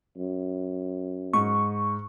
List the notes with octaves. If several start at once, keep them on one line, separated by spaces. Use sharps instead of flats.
F#2
G#2 C#6